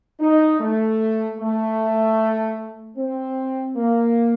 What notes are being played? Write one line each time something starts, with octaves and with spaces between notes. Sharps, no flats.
D#4
A3
A3
C4
A#3